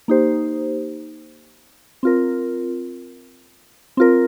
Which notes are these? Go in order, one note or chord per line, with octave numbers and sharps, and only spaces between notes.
A#3 D#4 G4 C5
C4 F4 A#4
C4 F4 A#4